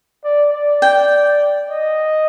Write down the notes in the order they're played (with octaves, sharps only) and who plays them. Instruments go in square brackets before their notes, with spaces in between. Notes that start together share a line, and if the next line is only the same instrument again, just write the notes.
[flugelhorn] D5
D5
[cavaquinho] G5
[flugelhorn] D#5